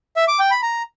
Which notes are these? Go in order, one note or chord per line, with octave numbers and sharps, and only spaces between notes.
E5
D6
G5
B5
A#5